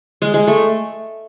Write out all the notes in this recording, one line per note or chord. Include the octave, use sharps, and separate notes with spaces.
G#3
G#3
A3